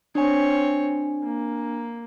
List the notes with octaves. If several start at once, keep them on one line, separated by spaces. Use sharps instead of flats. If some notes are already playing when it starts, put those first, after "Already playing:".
C4 D4 C#5 G#5
A#3